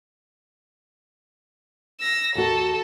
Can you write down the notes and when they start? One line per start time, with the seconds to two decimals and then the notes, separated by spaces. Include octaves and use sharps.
2.00 E6 A#6
2.35 D#2 F#4 A4